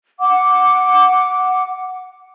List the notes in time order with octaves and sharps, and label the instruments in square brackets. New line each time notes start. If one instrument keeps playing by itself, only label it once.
[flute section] F#5 D6